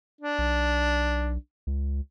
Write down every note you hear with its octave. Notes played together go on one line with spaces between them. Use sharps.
D4
B1
C#2